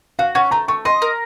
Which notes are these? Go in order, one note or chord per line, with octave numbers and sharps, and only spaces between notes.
F#4 F5
C#4 F#5
A3 A#5
A3 C#6
D#5 C6
A#4